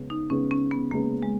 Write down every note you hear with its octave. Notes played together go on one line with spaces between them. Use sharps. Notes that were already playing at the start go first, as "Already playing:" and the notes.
Already playing: C#3 G#3 B3
D#4
C#3 G#3 B3 C#4
C#4
B3
C#3 G#3 A#3 B3
G#3